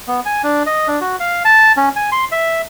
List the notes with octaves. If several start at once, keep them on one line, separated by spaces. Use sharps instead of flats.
B3
G#5
D4
D#5
D4
F#4
F5
A5
C#4
G#5
C6
E5